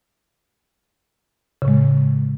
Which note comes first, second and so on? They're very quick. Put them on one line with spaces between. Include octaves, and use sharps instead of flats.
C#3 A2 G#3